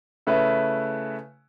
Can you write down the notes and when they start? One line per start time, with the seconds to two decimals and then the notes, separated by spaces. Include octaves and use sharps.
0.27 C#3 A3 E4 B4 E5